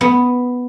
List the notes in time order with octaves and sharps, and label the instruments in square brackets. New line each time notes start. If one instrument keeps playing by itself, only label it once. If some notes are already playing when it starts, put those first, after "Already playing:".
[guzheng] B3